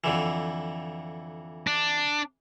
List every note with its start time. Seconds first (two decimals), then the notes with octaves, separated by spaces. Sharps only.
0.04 F2 D3 E3
1.67 D4